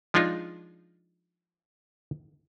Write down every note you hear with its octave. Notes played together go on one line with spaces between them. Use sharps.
F3 G#3 D4 D#4 F4